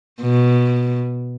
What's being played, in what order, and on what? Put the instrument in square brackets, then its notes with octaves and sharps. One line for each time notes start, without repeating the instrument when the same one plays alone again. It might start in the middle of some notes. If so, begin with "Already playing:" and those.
[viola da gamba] B2